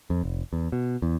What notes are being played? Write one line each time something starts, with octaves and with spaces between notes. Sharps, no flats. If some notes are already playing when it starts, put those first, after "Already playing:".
F2
F1
E2
B2
E2